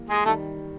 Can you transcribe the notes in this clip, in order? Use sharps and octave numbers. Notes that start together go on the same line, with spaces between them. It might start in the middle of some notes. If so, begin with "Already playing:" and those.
Already playing: E3 G3 A#3
G#3 G#4
D#3 G3 A3 A4